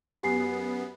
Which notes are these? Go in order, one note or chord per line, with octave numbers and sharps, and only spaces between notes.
F#2 B3 G4 G#5 C7